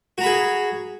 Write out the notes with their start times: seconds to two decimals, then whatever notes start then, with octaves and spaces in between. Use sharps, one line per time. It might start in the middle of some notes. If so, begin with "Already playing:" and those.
0.18 F#4
0.21 A#5
0.23 B5
0.26 G#4